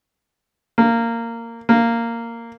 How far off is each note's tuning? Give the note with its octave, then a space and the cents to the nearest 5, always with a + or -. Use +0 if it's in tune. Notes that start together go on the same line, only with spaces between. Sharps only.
A#3 -15
A#3 -10